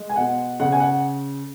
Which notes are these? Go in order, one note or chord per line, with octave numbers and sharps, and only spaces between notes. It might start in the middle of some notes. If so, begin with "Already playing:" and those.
Already playing: G#3
G#5
B2 F#5
C#3 F#5
G#5
F#5